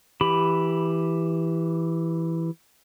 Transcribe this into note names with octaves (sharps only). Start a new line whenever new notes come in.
E3 G4 B5